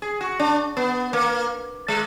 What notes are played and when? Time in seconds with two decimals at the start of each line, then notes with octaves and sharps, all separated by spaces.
0.02 G#4
0.21 F#4
0.39 D4
0.77 B3
1.13 A#3
1.88 G#3